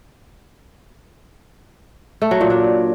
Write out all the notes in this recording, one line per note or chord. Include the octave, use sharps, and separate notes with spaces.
A3
F#3
A#2
D4